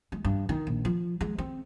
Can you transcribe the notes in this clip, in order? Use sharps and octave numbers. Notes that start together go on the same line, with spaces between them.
G#3
G2
D#3
A#1
F3
G#3
C4